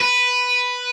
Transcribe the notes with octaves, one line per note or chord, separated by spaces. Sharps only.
B4